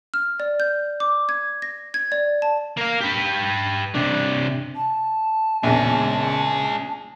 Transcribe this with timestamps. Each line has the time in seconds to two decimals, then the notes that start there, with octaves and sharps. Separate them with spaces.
0.14 F6
0.40 D5
0.60 G6
1.00 D6
1.29 G#6
1.62 A#6
1.94 G#6
2.12 D5
2.42 A5
2.77 A#3 F5
3.00 G4 B4
3.95 C3 D4
4.75 A5
5.63 A#1 E2 G#3 C#4